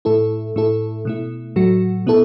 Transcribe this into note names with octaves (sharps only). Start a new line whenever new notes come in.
A2 A3 E4 A4
A2 A3 E4 A4
B2 A3 E4
A2 F#3 A3 F#4
B2 B3 E4 A4